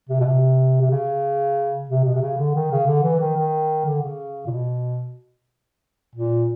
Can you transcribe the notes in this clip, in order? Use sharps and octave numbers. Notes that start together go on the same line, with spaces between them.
C3
B2
C3
C3
C#3
C3
B2
C3
C#3
D3
D#3
C#3
D3
E3
D#3
D#3
D3
C#3
A#2
B2
A#2